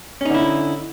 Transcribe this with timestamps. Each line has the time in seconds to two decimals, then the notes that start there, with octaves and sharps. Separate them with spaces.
0.21 C#4
0.25 D#4
0.30 D3
0.34 E4